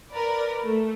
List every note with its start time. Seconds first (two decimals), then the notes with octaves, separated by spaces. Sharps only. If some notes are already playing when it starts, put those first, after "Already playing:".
0.11 A#4 B4 D5
0.63 A3